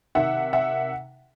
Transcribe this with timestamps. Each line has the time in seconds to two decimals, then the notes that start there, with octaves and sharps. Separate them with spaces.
0.15 C3 D#3 E5 F#5
0.53 E5 F#5